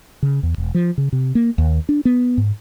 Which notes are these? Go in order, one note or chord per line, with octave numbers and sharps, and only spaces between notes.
C#3
E2
E1
F3
C#3
C3
A#3
D#2
D4
B3
G#2